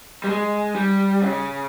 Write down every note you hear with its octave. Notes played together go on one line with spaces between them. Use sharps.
G3
G#3
G3
C#3